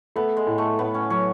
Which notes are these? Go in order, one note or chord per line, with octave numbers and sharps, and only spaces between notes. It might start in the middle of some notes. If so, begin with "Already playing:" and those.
A3 B3
G#3
A2
A3
A2 B3
C#4
F#3 C#4